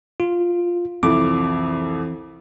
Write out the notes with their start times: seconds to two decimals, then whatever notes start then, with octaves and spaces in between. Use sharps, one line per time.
0.20 F4
1.03 C2 F2 E3 C4 D6